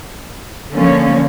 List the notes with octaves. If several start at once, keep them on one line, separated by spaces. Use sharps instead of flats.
D3 F3 A#3 C#4